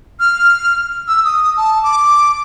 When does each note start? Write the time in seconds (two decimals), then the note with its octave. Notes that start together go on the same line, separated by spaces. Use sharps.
0.20 F6
1.08 E6
1.24 D#6
1.57 A5
1.83 D6